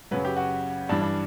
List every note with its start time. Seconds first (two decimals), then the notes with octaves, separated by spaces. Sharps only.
0.11 F#2 C#3 F#3 B4
0.25 G4
0.36 F#4
0.89 G2 E3 G3 D4
1.02 D4